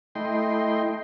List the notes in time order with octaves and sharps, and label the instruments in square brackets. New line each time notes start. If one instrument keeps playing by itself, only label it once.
[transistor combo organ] A3 E4 D#5 G5 C6